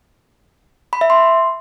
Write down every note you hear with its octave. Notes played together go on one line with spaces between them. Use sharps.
B5
E5
C6